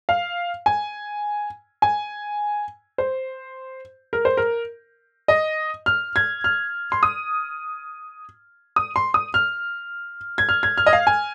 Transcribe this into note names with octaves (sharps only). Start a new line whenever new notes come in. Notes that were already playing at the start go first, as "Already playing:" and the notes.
F5
G#5
G#5
C5
A#4
C5
A#4
D#5
F6
G#6
F6
C6
D#6
D#6
C6
D#6
F6
G#6
F6
G#6
F6
D#5
F5
G#5